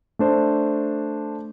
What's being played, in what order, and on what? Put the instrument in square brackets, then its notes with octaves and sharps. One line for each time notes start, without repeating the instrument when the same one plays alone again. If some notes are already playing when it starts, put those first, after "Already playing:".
[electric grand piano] A3 D4 C5